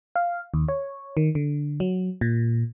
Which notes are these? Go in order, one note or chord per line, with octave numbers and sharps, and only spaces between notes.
F5
D#2
C#5
D#3
D3
F#3
A#2